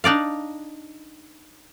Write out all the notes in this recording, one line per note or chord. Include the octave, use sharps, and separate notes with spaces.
D4 D#4 D5 F5